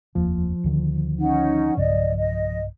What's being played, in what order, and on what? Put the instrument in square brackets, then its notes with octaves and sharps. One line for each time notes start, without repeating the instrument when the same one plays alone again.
[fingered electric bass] F1 D#2 A#3 [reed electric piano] F3
[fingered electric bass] D2 D3 D#3
[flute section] C#4 D#4 F#5
[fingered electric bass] B1 G2 C#3 [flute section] D5 D#5
[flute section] D#5